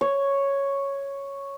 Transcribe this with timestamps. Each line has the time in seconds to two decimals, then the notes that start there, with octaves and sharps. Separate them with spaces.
0.01 C#5